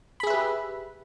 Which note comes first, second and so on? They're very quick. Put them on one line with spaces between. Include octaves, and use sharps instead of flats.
B5 G#4 E5 B4 G4